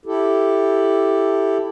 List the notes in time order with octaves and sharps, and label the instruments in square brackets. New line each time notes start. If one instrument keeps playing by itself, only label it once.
[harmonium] E4 G4 A4